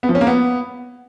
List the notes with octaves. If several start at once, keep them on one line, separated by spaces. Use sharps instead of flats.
B3
F3
C#4
A#3
B3